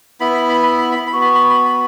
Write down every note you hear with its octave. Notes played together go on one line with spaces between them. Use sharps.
B3 E4 B5
B5
B5
B5
B5
B5
B5
B3 F#4
B5
B5
B5
B5